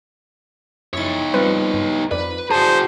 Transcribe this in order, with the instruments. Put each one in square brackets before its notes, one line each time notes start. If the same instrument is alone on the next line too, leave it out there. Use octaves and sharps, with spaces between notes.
[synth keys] F#2 E4 A6 [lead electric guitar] D#4 C#5
[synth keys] G3 C4 F4 [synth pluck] B4
[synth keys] G2
[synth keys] F2 [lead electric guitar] B4 [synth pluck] D5
[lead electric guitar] F#4 G#4 [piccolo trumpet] C5 [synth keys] D5 D#6 [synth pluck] A5